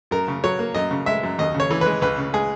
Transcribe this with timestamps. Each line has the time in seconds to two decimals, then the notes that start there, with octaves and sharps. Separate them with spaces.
0.11 F#2 A#4
0.28 C#3
0.44 F#3 C#5
0.59 A#3
0.74 F#2 D#5
0.91 C#3
1.06 G#3 E5
1.23 F#2
1.38 D#2 D#5
1.54 C#3
1.60 C#5
1.70 E3
1.81 G#3 B4
2.01 C#2 B4
2.18 C#3
2.33 G#3 G#4